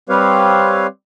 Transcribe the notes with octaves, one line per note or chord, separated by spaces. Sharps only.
G3 C4 G4 B4 C#5 F5